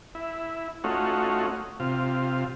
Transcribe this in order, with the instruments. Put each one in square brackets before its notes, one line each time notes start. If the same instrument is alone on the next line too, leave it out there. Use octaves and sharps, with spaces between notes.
[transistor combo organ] E4
A3 C#4 D#4 F4 F#4
C3 F4